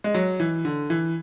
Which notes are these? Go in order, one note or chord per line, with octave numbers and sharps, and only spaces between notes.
G#3
F#3
E3
D3
E3